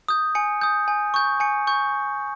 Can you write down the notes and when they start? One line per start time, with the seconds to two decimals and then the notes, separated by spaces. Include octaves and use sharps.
0.08 D#6 G6
0.35 G#5 C#7
0.61 D#6 G6
0.88 G#5
1.14 C#6 G6
1.40 G#5 C#7
1.67 C#6 G6